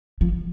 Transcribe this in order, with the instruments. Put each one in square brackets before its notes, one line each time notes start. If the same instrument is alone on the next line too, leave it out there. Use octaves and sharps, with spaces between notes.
[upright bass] F3